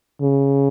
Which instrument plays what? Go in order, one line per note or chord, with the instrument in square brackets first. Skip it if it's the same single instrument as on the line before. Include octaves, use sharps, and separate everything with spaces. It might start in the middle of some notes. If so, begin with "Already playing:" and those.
[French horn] C#3